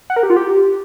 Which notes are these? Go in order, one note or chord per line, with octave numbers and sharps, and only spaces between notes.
F#5
A#4
G4
F4
G4